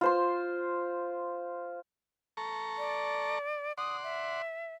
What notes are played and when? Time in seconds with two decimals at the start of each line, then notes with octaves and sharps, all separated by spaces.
0.01 F4 C5 C6
2.37 A4 A#5 C#6
2.78 D5
3.78 D5 F#5 C6 D#6
4.03 E5